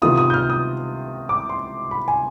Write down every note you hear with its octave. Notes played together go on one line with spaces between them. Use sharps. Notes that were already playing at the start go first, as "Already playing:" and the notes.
C3 D#3 B3 F4 D#6
D#6
G6
F6
D#6
D6
C6
B5
G#5